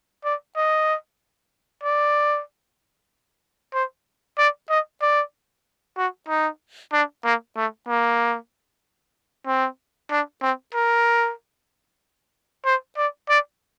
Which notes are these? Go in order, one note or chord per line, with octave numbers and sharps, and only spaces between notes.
D5
D#5
D5
C5
D5
D#5
D5
F#4
D#4
D4
A#3
A3
A#3
C4
D4
C4
A#4
C5
D5
D5